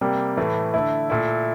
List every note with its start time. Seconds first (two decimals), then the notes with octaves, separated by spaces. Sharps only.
0.01 C3 G3 A#3
0.37 A2 E3 A3
0.74 D3 A3 E4
1.10 A#2 A3 E4